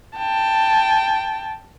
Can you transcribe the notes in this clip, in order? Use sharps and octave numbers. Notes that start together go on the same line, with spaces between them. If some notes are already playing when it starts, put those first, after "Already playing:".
G5 A5